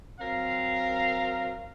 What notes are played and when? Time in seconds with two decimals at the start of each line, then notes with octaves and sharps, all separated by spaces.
0.20 F#3 C4 A#4 F5